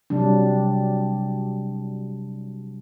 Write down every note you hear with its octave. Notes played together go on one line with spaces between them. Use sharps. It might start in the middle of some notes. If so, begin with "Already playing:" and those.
C3 F#3 G3 D4